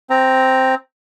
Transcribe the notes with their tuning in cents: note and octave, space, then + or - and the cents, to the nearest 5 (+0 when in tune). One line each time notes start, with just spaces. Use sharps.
C4 +0 A#5 -5